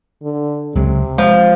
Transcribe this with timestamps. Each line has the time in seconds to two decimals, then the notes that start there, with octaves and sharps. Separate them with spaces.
0.23 D3
0.75 C#2 C3 F#3 G#3
1.18 F3 G#3